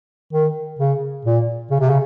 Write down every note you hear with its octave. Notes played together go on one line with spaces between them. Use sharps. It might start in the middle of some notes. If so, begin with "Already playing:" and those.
D#3
C#3
A#2
C#3
C3
C#3